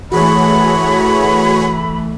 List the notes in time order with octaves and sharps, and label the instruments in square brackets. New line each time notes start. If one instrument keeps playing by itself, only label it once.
[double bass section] E3 A3 [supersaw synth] F#4 G#4 C#5 [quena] B5